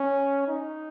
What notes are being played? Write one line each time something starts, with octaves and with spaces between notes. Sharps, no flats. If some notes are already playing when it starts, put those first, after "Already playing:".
Already playing: C#4
D#4